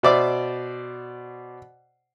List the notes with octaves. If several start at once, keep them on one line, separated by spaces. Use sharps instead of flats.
B2 C5 D5 E5 D6